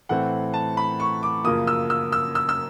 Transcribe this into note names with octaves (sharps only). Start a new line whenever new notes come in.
A2 E3 A3 C4 F#5
A5
B5
C#6
D6
F#2 C#3 F3 A#3 D#6
E6
E6
E6
E6
E6